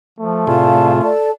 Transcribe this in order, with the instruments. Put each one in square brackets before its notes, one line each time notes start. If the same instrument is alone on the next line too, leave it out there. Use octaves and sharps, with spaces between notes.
[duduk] F3 [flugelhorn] A3
[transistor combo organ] A2 C3 G#4 [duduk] F4 [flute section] D5 F5 A5
[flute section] A4 D5 A5